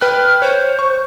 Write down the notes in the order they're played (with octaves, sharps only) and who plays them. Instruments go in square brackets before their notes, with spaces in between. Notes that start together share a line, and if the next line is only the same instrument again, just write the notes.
[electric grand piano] B4 G5 F#6 [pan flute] F6
[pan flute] C5 [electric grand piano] C#5
[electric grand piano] C#6